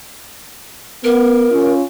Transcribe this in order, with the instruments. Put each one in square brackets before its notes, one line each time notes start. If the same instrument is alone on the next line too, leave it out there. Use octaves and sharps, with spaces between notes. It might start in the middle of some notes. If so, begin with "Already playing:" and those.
[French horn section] B3 [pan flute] A#4
[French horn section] C#4 F4